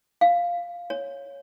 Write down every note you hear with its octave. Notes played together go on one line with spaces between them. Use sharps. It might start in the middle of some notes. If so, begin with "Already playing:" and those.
F5
C#5